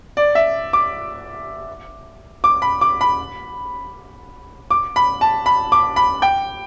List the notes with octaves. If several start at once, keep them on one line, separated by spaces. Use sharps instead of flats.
D5
E5
D6
D6
B5
D6
B5
D6
B5
A5
B5
D6
B5
G5